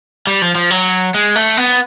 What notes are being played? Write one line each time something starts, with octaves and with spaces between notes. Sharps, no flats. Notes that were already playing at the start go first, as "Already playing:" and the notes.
G3
F3
F3
F#3
G#3
A3
B3